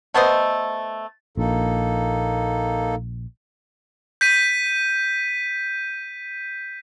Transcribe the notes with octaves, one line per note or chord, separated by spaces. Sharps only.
A3 B3 C5 D#5
A#1 A#3 D#4 A4
G6 B6 D#7